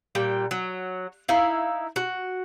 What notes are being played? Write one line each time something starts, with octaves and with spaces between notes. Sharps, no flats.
A#2 G3 G5
F#3
D#4 E4 F5
F#4